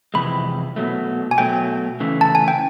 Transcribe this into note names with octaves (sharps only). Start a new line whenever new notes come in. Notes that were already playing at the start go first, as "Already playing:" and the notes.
F2 C3 E3 G#3 B5
B2 F#3 A3
G#5
B2 F#3 A3 G5
C#3 E3 A3
A5
G#5
G5